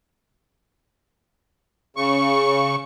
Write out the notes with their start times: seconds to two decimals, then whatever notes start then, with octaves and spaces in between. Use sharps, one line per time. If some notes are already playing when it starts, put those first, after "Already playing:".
1.97 C#3 C#6